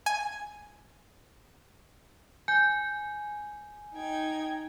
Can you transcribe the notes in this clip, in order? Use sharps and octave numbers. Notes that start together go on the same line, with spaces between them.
G#5
G#5 G6
D#4 G5 G#6